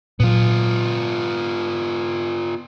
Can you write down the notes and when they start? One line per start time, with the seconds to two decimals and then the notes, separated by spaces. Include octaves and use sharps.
0.20 A#2 F#3 B3 F4